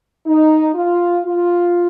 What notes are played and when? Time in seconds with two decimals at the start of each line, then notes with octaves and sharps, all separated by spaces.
0.25 D#4
0.75 F4
1.25 F4